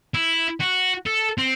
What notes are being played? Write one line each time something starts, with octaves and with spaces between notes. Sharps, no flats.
E4
F#4
A4
C4